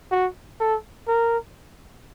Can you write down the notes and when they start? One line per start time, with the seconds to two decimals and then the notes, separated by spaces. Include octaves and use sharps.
0.12 F#4
0.60 A4
1.08 A#4